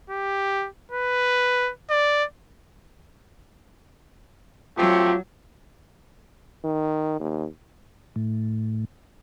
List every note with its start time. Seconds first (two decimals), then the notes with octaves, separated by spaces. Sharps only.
0.10 G4
0.92 B4
1.90 D5
4.78 F#3 A3 C4 F4 G4
6.64 D#3
7.20 D#2
8.16 A2